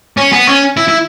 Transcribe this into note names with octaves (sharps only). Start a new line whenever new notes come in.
C#4
B3
C#4
E4
E4